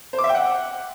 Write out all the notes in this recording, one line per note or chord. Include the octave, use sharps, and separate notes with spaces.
C5
D6
E5
G5
F#5